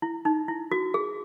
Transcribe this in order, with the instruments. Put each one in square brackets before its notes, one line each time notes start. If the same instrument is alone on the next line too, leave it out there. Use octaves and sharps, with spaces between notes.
[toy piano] E4
D#4
E4
F#4
G#4